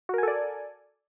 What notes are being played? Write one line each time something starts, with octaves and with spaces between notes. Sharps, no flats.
F#4 A4 A#4 D5 G#5